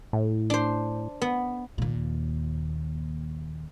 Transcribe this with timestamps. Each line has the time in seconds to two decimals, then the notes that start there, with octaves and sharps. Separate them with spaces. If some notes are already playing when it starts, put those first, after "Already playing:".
0.13 A2
0.50 D4 C5
1.21 B3
1.78 D#2 A#2